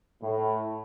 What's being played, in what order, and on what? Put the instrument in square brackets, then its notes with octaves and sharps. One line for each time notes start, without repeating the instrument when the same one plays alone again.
[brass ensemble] A2